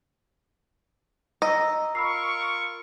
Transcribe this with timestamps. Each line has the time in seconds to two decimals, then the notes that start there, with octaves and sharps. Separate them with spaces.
1.42 D#5 A#5 E6
1.95 F4 A#4 B5 C#6 E6 C7